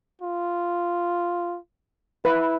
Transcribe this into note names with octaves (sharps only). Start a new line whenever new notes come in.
F4
E4 B4